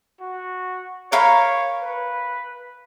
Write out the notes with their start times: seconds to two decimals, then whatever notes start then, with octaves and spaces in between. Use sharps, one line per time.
0.21 F#4
1.12 A#4 C#5 F5 B5
1.82 B4